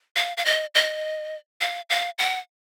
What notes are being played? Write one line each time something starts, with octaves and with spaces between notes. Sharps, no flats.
F5
F5
D#5
D#5
F5
F5
F#5